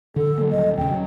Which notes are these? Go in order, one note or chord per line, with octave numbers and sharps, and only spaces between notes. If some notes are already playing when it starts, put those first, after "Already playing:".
D3 A4
F#3 A#3
D#1 D#5
D#2 C#3 G5
F#3